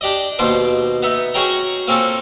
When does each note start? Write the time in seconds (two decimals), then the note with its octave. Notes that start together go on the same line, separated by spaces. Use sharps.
0.01 D4 G4 D5 D#5
0.39 D#2 B2 C5 C6 D6
1.03 B3 D#4 E5
1.34 C#4 F#4 G#4 C#5 G5 A#5
1.88 A#3 C4 C#4 F4 A4